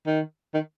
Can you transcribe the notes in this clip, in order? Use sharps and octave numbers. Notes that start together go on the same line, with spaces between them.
D#3
D#3